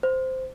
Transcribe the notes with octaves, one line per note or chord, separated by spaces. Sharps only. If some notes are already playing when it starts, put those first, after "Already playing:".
C5